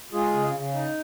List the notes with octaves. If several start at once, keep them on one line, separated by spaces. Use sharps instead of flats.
G#3 F4 G#4
C#3
C#3
D#4